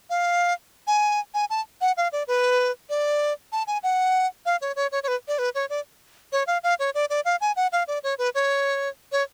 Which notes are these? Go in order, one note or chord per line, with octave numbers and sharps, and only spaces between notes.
F5
G#5
G#5
A5
F#5
F5
D5
B4
D5
A5
G#5
F#5
F5
C#5
C#5
C#5
C#5
B4
D5
B4
C#5
D5
C#5
F5
F5
C#5
D5
D5
F5
G#5
F#5
F5
D5
C#5
B4
C#5
C#5